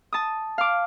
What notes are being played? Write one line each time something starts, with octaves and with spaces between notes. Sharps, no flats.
A5 D#6
F5 D6